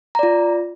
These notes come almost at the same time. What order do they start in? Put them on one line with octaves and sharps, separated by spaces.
A#5 D5 F4